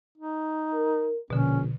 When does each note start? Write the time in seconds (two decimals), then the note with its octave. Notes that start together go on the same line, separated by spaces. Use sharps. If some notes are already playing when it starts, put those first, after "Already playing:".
0.18 D#4
0.73 A#4
1.30 A#1 B2 D3 C#4